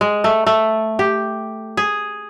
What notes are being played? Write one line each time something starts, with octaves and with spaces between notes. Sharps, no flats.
G#3
A3
A3
G4
G#4